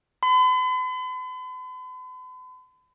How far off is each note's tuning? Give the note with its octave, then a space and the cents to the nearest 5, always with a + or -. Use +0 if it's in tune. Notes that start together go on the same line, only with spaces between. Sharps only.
B5 +45